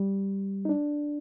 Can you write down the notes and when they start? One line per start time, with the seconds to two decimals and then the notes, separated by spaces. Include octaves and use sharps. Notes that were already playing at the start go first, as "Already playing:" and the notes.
Already playing: G3
0.65 D#4
0.69 D4